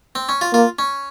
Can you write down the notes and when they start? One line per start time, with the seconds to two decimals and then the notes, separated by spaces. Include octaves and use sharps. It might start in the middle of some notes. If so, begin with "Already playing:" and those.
0.15 C4
0.29 C#4
0.41 F4
0.53 A#3 F4
0.79 C#4